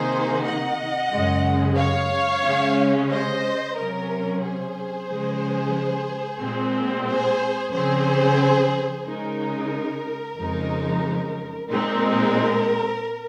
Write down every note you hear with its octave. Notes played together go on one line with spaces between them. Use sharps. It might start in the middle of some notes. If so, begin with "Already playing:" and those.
Already playing: C3 D#3 A#3 D#4 G#4 C5
D#5 F#5
F#2 C#3 G#3
C#5 F5
C#3 G#3 C#4
C5 D#5
C3 F#3 C#4 A#4
G#4 C5
C#3 F3 G#3
A#2 G#3 C4
G#4 C5
C#3 F3 C4 G#4 C5
C#3 G#3 D#4 A#4
F2 C#3 F3 G#3 D#4
A#2 G#3 C4 D#4 A#4